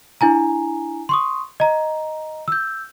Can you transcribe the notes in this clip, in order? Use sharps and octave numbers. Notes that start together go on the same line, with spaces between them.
D4 E4 G#5 A#5
C6 C#6 D#6
D#5 A#5
E6 G6